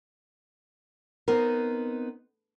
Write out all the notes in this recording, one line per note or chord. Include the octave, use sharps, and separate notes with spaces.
B3 C4 D#4 A#4